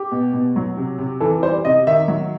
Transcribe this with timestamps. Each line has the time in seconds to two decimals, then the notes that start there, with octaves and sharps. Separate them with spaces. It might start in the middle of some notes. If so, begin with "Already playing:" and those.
Already playing: G4
0.12 B2
0.33 B2
0.56 F#3
0.77 C3
0.99 C3
1.20 E3 A4
1.42 G3 C5
1.65 C3 D#5
1.87 D#3 E5
2.08 F#3